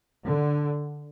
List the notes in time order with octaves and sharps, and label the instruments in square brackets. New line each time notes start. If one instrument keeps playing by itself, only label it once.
[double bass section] D3